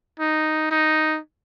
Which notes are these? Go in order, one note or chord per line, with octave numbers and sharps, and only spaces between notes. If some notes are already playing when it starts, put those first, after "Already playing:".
D#4
D#4